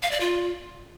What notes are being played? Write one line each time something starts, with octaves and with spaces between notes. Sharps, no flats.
F5
D5
F4